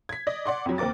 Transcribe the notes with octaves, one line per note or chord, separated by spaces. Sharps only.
G#6 B6
D5 D#5
D5 F#5 C6 D6
F2 F#3
D#2 C4 A#4 D6 A6